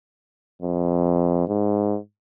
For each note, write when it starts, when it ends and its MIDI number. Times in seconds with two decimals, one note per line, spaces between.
0.62 1.47 41
1.48 1.98 44